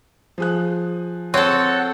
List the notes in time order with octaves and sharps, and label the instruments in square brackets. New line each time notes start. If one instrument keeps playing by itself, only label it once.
[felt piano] F3 G#4 F#6
[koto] C4 A4 [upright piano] C#5 [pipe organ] F#5